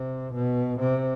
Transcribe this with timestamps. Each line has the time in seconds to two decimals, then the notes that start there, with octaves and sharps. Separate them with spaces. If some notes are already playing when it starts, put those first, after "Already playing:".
Already playing: C3
0.34 B2
0.80 C3